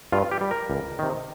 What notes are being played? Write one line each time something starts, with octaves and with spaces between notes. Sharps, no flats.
G2 F4
G4
G3
A#4
C#2
C3 D#3